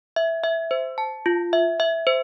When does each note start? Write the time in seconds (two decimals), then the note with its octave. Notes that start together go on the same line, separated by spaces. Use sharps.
0.16 E5
0.44 E5
0.71 C5
0.98 A5
1.26 F4
1.53 E5
1.80 E5
2.07 C5